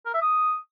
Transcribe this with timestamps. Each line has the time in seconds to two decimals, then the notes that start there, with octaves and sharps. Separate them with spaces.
0.06 A#4
0.14 E5
0.22 D#6